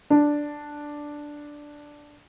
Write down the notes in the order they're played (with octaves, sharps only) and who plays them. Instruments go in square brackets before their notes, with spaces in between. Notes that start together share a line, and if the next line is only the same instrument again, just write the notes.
[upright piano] D4